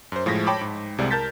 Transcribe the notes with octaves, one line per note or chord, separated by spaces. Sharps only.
F#2 C5
A2 F3 G#3 A#6 B6
C#5 G5 A5 B5 D6
G#2
C2 C3 G#3 D5
A#4 A5 G6 A6 B6